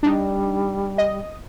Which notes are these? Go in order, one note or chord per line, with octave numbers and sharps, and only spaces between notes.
G3 D4 D#4
D#5